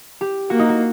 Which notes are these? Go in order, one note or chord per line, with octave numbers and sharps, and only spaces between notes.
G4
A#3 F#4
D#4
F#4